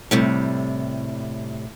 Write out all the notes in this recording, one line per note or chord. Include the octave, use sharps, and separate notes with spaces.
A2 C3 G3